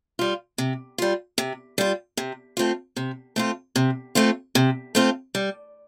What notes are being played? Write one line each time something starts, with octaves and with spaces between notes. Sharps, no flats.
G3 F4
C3
G3 F4
C3
G3 F4
C3
A3 C4 F4
C3
A3 C4 F4
C3
A3 C4 F4
C3
A3 C4 F4
G3